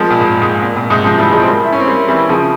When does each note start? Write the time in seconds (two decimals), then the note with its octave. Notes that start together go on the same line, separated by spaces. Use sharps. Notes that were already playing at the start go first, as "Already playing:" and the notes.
Already playing: F3 G3 G#3 A#3
0.10 A#2
0.21 G#2
0.41 G#2
0.62 A#2
0.76 A#2
0.90 G#2 C3
1.04 C#3 F3
1.18 E3 G3
1.32 F3 G#3
1.41 C4
1.45 G3 A#3
1.64 E4
1.72 C#4
1.80 C4
1.87 G3 A#3
2.08 E3 G3
2.29 C#3 F3